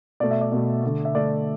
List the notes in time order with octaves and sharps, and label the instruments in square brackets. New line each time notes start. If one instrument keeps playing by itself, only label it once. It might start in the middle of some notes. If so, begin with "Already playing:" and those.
[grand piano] B2 A3 D5
E5
D5
B2 A3
D3 A3
E5
D3 A3 D5